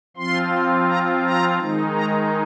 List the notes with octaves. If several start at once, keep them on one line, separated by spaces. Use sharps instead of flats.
F3 C4 F4 C6
A#5
A#5
D#3 G#3 D#4
A#5